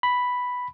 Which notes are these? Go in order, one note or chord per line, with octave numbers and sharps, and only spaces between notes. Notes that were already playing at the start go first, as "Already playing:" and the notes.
B5